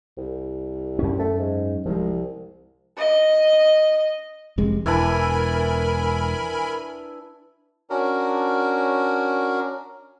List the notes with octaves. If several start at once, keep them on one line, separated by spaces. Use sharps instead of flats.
C2
F#2 C#4
A3
G#2
C2 F3 G#3
D#5
F1 C3 G#3
E1 E3 D4 E4 A#4 G#5 B5
C#4 D4 F#4 A#4